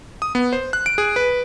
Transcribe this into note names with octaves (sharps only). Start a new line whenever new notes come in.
D#6
B3
C5
F#6
D7
G#4
B4